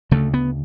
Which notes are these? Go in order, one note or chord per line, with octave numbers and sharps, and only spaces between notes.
D2 C#3 A3
B3